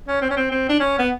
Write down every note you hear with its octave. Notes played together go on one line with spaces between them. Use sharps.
C#4
C4
C#4
C4
C4
D4
C#4
B3